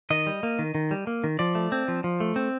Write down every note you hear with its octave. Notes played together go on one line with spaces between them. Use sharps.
D#3 D#5
G3
A#3
D#3
D#3
G3
A#3
D#3
F3 D5
A3
C4
F3
F3
A3
C4